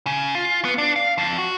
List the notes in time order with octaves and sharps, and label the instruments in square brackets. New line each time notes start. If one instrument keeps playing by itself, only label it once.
[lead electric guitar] C#3
F4
B3
D4
F5
F2
F#4